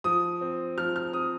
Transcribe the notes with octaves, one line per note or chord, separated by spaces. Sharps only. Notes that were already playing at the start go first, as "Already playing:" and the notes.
F3 D#6
C4
F3 F6
F6
C4 D#6